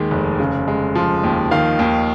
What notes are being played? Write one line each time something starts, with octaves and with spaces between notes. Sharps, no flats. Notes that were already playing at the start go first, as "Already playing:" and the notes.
Already playing: D#2 D#3 G#3
F1
C#3
G#3
F3
D#2
D#3 F5
D#2